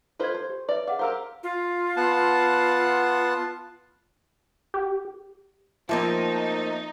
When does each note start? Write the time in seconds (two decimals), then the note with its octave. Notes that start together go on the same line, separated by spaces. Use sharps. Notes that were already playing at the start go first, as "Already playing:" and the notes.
0.20 F4 A4 B4 C5 D#5 G#6
0.34 C5
0.49 G4
0.69 B4 C#5 D5 E5
0.87 G#4 F5 F#5 D6
0.99 G4 A#4 C5 F5 A#5 E6
1.43 F4
1.97 B3 F#5 A5
4.74 G4
5.89 F3 A3 A#3 C4 D#4